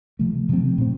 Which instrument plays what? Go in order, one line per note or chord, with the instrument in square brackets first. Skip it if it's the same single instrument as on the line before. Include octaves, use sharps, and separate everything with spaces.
[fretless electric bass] C3 F3 A3
C3 F3 A3 C4
A#2 A3 C4